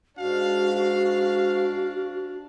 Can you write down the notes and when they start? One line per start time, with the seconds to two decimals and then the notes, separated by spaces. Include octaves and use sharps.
0.18 G#2 D4 F#4 F5